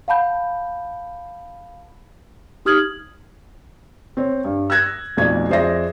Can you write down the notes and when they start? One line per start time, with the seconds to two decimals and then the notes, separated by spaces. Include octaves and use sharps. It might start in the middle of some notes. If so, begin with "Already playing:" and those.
0.08 F5 F#5 A5 B5 G6
2.65 D#4 G4 D#6 F6 G#6 F#7
4.17 C4 C#5
4.44 G2
4.70 E6 F#6 G#6 A#6
5.17 B1 F2 A3 D5 G#6
5.49 F2 G#4 C5 D5 E5 A#6